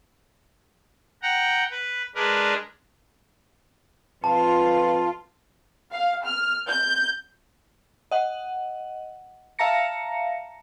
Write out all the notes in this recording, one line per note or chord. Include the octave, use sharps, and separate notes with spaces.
F#5 G5 A#5
B4
G#3 D4 A#4 B4
F2 F4 B4 A5
F5
F6
G6
D#5 F#5
E5 F5 A5 A#5 A#6 C#7